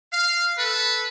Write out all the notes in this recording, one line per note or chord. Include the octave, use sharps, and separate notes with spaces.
F5
A4 B4